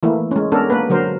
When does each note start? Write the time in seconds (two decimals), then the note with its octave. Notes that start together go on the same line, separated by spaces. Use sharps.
0.03 E3 A3 A#3 E4
0.31 G#3 C#4
0.52 B3 C#4 D4 A4 A#4
0.70 A#3 B4
0.90 D3 F#3 A#4 C5